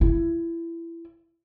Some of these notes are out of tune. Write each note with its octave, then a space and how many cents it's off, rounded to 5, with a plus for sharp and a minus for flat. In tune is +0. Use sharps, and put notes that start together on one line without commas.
E4 +20